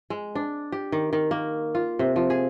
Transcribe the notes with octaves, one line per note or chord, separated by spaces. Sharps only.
G#3
D4
G4
D#3
D#3
A#3
F4
C3
F3
G#4